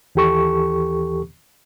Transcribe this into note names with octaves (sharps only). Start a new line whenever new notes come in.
D#2 E3 G4 A4 C#6